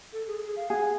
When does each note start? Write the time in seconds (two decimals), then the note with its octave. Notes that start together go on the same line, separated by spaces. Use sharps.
0.13 A4
0.27 G#4
0.41 G#4
0.56 F5
0.69 G#4 F#5